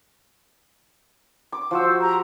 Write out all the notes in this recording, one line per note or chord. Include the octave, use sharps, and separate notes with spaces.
D6
F3 F#4 C5 E6
G4 A#5